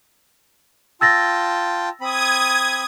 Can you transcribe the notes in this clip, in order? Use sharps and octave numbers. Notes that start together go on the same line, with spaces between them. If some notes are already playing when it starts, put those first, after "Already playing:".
F4 G5 A5 E6 A6 A#6
C4 B5 D#6 G#6